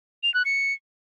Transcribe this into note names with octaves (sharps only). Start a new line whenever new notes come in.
F7
F#6
C#7